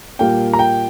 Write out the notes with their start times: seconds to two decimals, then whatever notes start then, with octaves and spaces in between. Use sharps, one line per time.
0.19 A#2 G3 A#3 G5
0.53 A#5
0.59 G5